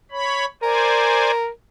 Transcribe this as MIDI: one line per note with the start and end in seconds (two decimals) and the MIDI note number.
0.11 0.46 73
0.11 0.46 83
0.62 1.48 70
0.62 1.31 72
0.62 1.31 74
0.62 1.31 80